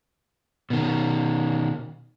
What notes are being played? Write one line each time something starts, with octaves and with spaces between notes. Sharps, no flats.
B2 D#3